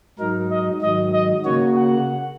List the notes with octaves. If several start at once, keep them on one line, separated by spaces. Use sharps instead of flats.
G#2 F#3 D#4 A#4
D#5
G#2 D#3 F#3 D#5
D#5
C#3 A#3 F#4 C#5
F#5